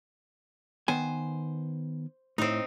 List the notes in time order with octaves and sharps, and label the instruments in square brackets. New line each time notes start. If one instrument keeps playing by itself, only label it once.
[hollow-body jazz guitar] D#3 B3 G#5 [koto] C5
[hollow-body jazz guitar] A2 [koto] C4 D#4